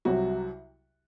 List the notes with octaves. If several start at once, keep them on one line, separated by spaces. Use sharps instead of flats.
C2 C3 F#3 F#4